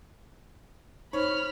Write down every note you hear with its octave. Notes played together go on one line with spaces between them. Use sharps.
D#4 C5 C#5 B5 F6